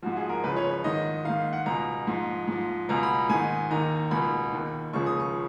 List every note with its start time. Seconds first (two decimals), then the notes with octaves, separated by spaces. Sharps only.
0.02 G#2 F3 F#4
0.17 G#4
0.29 A#4
0.43 C#2 C#3 F3 B4
0.57 C#5
0.70 C#5
0.84 G#2 D#3 D#5
1.25 G#2 D#3 F5
1.53 F#5
1.66 C#2 B2 A#5
2.07 G#2 F3
2.47 G#2 F3
2.89 C#2 B2 A#5
3.03 B5
3.29 G#2 D#3 G#5
3.70 D#2 D#3 A#5
4.11 C#2 B2 B5
4.52 D#2 D#3
4.93 C#2 C#3 F3 C#6
5.06 D#6
5.20 C#6